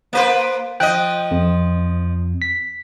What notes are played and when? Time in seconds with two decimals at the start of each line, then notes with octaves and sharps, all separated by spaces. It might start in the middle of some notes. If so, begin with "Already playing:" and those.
0.13 A#3 B4 C5
0.80 F3 D#5 G5 F#6
1.31 F2
2.42 B6